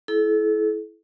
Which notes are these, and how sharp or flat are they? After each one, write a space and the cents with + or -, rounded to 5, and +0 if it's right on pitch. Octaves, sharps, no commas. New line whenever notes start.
E4 +0 A4 -40